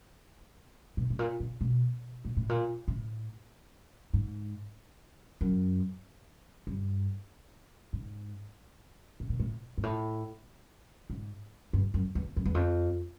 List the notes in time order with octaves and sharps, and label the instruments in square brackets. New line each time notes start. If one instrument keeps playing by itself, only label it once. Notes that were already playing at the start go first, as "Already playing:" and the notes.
[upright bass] B2
A2
A#2
A#2
B2
A#2
A2
A#2
A2
G#2
F#2
G2
G#2
A2
A#2
A2
G#2
A2
G#2
G2
F#2
E2
F2
E2
F2